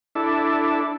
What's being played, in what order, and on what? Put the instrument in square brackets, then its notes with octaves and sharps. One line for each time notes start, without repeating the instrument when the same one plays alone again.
[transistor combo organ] D4 E4 A4